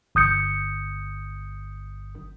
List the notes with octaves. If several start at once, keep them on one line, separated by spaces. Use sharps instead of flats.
G1 D#6 G6 C#7